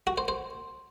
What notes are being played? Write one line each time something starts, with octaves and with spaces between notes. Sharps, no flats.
F#4
C5
C5